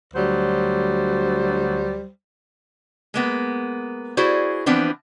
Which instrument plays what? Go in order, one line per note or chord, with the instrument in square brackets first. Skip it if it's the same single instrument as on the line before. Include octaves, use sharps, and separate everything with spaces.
[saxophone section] D2 F#3 G3 C5
[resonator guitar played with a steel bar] G#3 A#3 B3
E4 F#4 G#4 C5 D5
E3 F3 B3 C4 D4